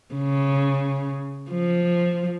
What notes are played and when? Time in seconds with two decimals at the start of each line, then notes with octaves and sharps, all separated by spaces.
0.15 C#3
1.51 F3